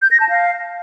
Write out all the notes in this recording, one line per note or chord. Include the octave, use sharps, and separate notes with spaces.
G6
A#6
A5
F5